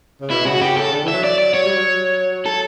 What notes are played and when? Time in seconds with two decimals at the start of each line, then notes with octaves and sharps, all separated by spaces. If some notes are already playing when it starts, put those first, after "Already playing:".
0.21 C#3
0.31 B2 E4
0.46 C#3 F#4
0.61 C#3 G4
0.77 C#3 A4
0.93 D3
1.03 E3
1.08 E5
1.13 F#3
1.24 D5
1.38 D5
1.54 F#3 C#5
1.65 G3
1.76 F#3
2.46 A4